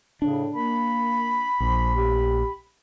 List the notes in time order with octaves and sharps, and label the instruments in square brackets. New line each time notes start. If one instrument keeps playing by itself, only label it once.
[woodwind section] A2 C#3 [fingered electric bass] D4
[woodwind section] A#3 [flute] B5
[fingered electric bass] A#1 [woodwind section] F3
[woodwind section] G4